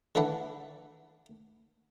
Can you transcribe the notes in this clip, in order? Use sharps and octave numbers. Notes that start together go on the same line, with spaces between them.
D3 E3 A3 D4 E4 F#5